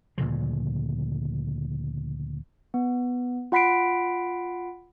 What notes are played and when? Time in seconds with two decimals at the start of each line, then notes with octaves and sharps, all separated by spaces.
0.18 D2 A#2 C#3 F3
2.74 B3
3.52 F4 F#5 B5 B6 C7 D7